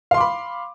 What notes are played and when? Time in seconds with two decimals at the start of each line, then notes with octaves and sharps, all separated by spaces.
0.11 F5
0.14 C6
0.17 D6
0.21 B5